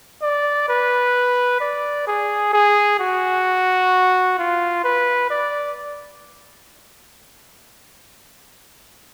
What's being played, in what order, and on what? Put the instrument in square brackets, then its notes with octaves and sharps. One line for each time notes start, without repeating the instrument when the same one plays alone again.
[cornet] D5
B4
D5
G#4
G#4
F#4
F4
B4
D5